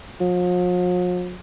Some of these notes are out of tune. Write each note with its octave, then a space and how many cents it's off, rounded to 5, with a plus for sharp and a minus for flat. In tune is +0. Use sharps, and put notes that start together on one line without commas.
F3 +45